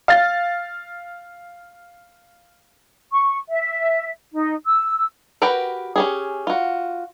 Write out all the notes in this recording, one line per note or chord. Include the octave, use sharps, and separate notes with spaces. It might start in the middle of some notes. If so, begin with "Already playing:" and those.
F5 A6
C#6
E5
D#4
E6
F#4 G4 A#4 B4 G5
C#4 G4 G#4
F4 F#4